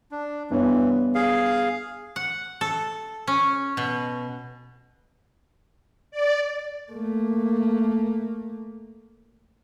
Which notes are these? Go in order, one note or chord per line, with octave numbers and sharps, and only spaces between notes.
D4
G2 E3 B3 C#5
G#4 F5
F#5
A4
C#4
B2
D5
A3 A#3